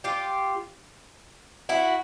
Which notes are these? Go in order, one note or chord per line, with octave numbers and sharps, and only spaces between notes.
F4 G4
E4 F#4